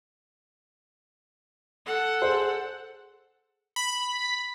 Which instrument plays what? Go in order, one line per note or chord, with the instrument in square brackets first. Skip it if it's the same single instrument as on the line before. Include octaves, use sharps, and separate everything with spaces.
[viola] A4 F#5
[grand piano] G#4 C5
[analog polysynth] B5